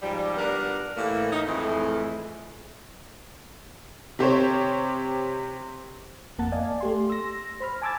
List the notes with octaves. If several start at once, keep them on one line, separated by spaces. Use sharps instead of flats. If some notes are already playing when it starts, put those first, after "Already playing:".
G#2 F3 G3
G3 B3 D4 A#4
A2 E3 A#3
D#4
F2 A2 E3 G#3 A3
C3 G4 C5 C#5
G#1 F2 A#3 F#5 A5 A6
D5 D#5 F5 G#5
A3 G4 C6
E6 A#6
C5 B5 F6
G#5 A5 D6 E6 G#6 A6